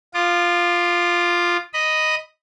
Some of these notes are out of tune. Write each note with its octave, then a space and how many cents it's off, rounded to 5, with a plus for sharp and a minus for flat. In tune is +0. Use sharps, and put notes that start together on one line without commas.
F4 +0 D6 +40
D#5 +0 B5 +0